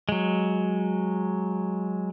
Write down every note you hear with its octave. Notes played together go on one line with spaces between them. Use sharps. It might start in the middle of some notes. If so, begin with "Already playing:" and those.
F#3 G#3